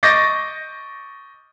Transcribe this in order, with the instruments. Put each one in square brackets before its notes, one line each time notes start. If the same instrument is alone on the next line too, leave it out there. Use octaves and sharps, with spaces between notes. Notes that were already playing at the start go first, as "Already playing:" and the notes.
[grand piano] D#5 C#6 D6 G6 A6 A#6